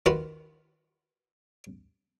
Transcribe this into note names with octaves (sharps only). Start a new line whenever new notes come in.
D#3 F4 F#4 B4 F5 C6